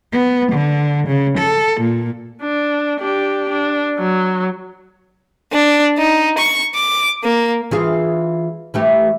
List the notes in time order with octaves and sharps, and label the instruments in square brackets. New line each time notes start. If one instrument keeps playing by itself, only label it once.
[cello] B3
D3
C#3
A4
A#2
[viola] D4
D4 G4
D4
F#3
[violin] D4
D#4
C#6
D6
A#3
[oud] E3 F4 G#4
E3 A3 G4